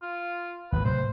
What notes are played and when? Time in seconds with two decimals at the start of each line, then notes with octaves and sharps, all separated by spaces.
0.02 F4
0.72 G#1 D#2 E3 B4
0.85 A2 C3 F#3 C5